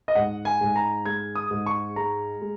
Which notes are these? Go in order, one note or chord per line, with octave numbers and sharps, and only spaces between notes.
D#5
G#2 F#5
G#5
G#2
A#5
G#3 G#6
D#6
G#2
C#6
G#3 A#5
G#3